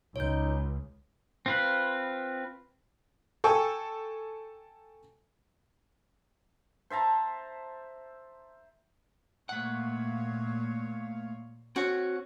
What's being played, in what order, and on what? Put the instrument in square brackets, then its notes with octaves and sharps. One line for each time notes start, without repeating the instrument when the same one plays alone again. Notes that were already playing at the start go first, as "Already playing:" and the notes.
[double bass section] C#2 [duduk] D#4 [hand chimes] C#5 G6
[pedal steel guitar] C4 F4 B4
[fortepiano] A4 G5 G#5 C#6
[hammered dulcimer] C5 E5 A5 A#5
[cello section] A#2 C#5 F5 [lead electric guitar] A3 F#5
[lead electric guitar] C4 C#5 [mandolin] F#4